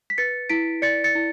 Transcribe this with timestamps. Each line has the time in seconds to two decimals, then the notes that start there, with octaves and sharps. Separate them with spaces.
0.10 B6
0.18 B4 A6 C#7
0.49 E4 B6 D7
0.82 D5 A6 C#7
1.04 A6 C#7
1.15 E4